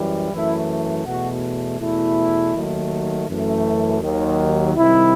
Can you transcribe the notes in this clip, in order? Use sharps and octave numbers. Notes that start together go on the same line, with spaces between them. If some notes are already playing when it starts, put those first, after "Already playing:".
Already playing: F#2 E3 G3
F#2 E3 A3 E4
E2 B2 A3 F#4
E2 B2 A3 E4
D#2 D#3 F#3 A3
F#2 E3 A3
D#2 D#3 F#3
C2 C3 D#3 G3 E4